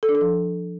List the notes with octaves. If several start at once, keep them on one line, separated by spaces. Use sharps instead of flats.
A4
D4
A4
F3